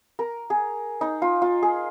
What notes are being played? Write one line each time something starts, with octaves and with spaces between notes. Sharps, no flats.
A#4
G#4
D#4
F4
F4
G#4